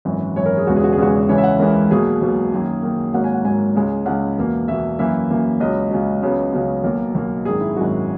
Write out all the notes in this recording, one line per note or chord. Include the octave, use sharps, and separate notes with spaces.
G#1 F#2 E3
G#1 F#2 E3 C#5
A#4
G#4
E1 E2 C#3 G#3 B3 F#4
G#4
F#4
G#4
E1 E2 C#3 G#3 B3 F#4
C#2 C#3 E3 G#3 C#5
E5
F#5
C#2 C#3 E3 G#3 A#4
B1 B2 A#3 G#4
B1 B2 A#3
F#2 D#3 A#3
F#2 D#3 A#3
G#1 G#2 F#3 A#3 F#5
G#5
F#5
G#1 G#2 F#3 A#3 G#5
C#2 C#3 G#3
C#2 C#3 G#3 F#5
E2 B2 A#3
E2 B2 A#3 E5
F#2 E3 A#3 E5
F#2 E3 A#3
C#2 C#3 F#3 D#5
C#2 C#3 F#3
C#2 C#3 F#3 B3
C#2 C#3 F#3 B3
B1 B2 A#3
B1 B2 A#3
G#1 F#2 D#3 G#4
E4
G#1 F#2 D#3 F#4